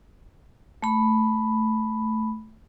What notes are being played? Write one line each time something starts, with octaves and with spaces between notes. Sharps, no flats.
A3 B5